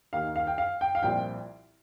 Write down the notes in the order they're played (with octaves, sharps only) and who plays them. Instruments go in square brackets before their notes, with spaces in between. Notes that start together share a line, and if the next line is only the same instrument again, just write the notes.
[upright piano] D#2 D#3 F5
F5
G5
F5
G5
F5
C2 A#2 F3 G5